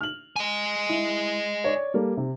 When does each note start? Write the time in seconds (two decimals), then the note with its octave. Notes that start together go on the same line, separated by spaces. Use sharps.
0.01 F6 F#7
0.36 D#5 G#5
0.89 E4
1.64 C#5 D5
1.94 G3 A#3 A4
2.17 C3